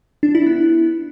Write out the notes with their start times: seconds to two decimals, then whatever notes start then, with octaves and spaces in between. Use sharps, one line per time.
0.23 D4
0.35 E4
0.46 B3